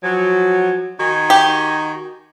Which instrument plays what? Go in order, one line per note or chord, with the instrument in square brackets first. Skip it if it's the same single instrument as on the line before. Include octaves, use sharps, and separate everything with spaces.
[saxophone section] F3 F#3 [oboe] G#5
[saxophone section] D#3 D#4 F#4 [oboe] G#5
[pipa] G4